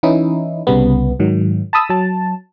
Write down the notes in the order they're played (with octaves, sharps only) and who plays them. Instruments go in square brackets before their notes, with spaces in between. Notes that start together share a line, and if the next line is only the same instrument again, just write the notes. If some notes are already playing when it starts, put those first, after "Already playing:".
[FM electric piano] E3 C#4 D#4 E4
C2 C#3 G3 B3
G#2 D#3 F#3
A5 B5 D#6 E6
F#3 A5